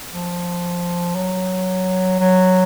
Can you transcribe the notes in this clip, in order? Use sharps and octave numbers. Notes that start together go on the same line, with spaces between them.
F3
F#3
F#3